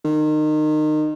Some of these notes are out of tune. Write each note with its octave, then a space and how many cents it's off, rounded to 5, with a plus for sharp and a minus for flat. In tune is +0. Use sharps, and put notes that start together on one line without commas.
D#3 -25